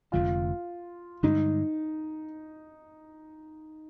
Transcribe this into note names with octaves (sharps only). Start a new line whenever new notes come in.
F1 F2 D3 G#3 F4
G2 D3 G#3 D#4